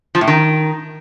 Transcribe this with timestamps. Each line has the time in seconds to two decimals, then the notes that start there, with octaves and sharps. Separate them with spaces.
0.15 F3
0.21 A2
0.27 D#3